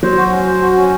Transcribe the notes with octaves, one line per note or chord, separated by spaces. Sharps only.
F#3 C5
F#4
C#4
C5
F#4
C#4